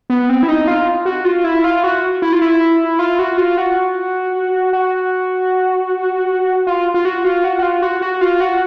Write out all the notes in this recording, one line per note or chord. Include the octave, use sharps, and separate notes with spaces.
B3
C4
E4
D#4
F4
F#4
F4
E4
F4
F#4
E4
F4
E4
F4
F#4
F4
F#4
F#4
F4
F4
F#4
F4
F#4
F#4
F4
F#4
F#4
F4
F#4